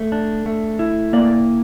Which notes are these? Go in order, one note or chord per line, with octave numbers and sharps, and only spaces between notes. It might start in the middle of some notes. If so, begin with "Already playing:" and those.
Already playing: A3
D4
A3
E4
A#3 D5